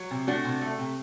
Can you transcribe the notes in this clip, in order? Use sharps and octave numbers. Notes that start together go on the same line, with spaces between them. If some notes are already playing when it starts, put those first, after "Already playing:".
Already playing: F#3
C3
A3 D4 F#4
C3
A3
C3